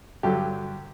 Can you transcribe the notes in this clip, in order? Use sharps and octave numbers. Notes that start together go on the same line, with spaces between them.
G2 D3 F#3 G4